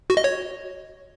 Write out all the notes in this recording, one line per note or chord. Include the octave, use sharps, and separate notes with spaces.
F#4
D#5
C#5